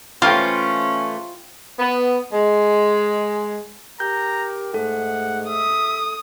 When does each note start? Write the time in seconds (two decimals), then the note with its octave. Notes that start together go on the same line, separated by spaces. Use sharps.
0.22 E3 A3 C#4 F4 C5 G5 B5 F6
1.79 B3
2.33 G#3
4.00 G4 A#4 A#5 G6
4.74 G#2 A3 A4 F#5
5.48 E5 D#6